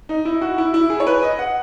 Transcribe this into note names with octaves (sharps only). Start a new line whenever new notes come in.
D#4
E4
F#4
E4
E4
G#4
C#5
B4
D#5
F#5